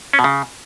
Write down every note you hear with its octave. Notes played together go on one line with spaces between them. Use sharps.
C#4
B2
C#3